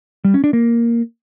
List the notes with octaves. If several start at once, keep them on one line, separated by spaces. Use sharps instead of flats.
G3
C#4
D4
A#3